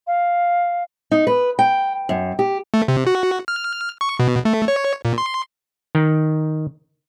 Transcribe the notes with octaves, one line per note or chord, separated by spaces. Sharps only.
F5
D#4
B4
G5
F#2
G4
A3
C3
F#4
F6
C#6
B2
A3
C#5
A#2
C6
D#3